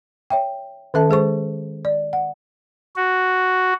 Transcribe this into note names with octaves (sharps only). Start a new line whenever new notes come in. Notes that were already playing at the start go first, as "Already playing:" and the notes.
C#5 E5 G5
D#3 C#4 A4 E5 A5
G#3 G#4 C5 C#6
D5
F#5
F#4